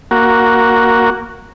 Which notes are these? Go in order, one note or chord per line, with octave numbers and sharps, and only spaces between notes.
A#3 F#4